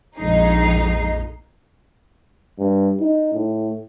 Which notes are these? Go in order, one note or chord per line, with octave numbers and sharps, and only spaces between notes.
A#1 F2 G#3 D#4 C7
G2
D#4
A2